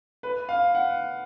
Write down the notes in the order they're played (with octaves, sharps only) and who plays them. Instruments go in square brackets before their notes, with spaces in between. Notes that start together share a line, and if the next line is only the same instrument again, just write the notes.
[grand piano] B4
F5
F#5